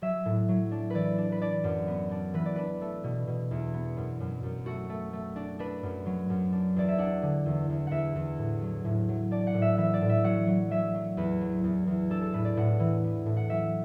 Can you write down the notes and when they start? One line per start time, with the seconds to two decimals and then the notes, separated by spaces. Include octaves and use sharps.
0.02 F#3 E5
0.25 A2
0.49 F#3
0.71 D4
0.90 E3 B4 D5
1.18 D4
1.32 B4
1.42 D4 D5
1.64 F#2
1.88 B3
2.11 D4
2.34 E3 B4
2.45 D5
2.56 D4 B4
2.81 A3
3.04 B2
3.27 B2
3.51 E2
3.74 B3
3.97 F#2
4.20 F#2
4.43 F#2
4.66 A3 F#4
4.89 A3
5.13 A3
5.36 D4
5.59 D4 B4
5.83 F#2
6.06 F#3
6.30 F#2
6.52 D4
6.76 E2 D5
6.89 E5
6.98 D4 F#5
7.22 D3
7.46 E2
7.69 E2
7.87 E2 E5 F#5
8.16 E2
8.38 A2
8.62 F#3
8.85 A2
9.09 F#3
9.31 D4 D5
9.47 F#5
9.54 A2
9.62 E5
9.77 E3 E5
9.94 D5
10.01 A2
10.09 E5
10.24 F#3 F#5
10.47 F#3
10.71 F#3 E5
10.94 F#3
11.17 E2 B4
11.41 F#3
11.64 E2
11.87 E2
12.10 D4 A4
12.21 A4
12.33 A2 B4
12.45 D5
12.57 A2 F#5
12.80 E3
13.04 B3
13.26 A2
13.37 F#5
13.50 F#3 E5